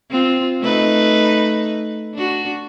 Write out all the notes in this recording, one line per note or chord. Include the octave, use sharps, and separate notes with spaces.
C4 F4
A3 D#4 B4
D4 F#4